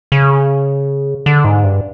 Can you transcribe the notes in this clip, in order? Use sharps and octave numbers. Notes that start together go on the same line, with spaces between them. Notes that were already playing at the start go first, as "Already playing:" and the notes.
C#3
D3
G#2
G2